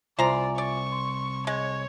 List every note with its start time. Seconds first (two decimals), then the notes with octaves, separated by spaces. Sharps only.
0.19 C2 F4 C5 D5 E5 G#5 A#5
0.58 D5 C#6
0.92 C6
1.47 G#3 C#5